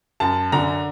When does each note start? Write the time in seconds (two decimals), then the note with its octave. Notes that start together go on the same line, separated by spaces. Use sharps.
0.20 F#2 A5
0.52 D3 A#5